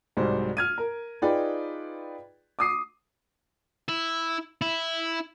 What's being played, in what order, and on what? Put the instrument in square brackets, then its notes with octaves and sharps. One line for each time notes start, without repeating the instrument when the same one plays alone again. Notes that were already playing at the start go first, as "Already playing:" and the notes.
[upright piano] C2 G#2 F#3 G3 C5
F6 G#6 D#7
A#4
D#4 F4 G#4 B4 D5 G5
D6 D#6 C7 D#7
[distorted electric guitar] E4
E4